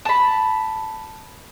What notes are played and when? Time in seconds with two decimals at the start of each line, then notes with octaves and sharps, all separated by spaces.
0.05 A5 B5